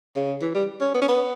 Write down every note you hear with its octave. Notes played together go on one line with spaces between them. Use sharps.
C#3
E3
G3
C#4
B3
C#4
B3